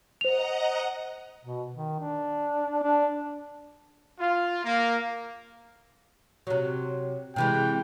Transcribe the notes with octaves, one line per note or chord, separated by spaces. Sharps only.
C5 D#5 F#5 A#5 F7
B2
D#3
D4
D4
F4
A#3
C3 F#3
C3 E3 G#3 G5